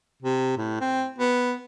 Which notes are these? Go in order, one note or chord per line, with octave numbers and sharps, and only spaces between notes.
C3
A2
C4
B3